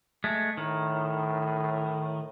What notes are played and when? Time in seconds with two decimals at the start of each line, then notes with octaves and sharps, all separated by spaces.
0.24 G#3 A3
0.57 A2 D#3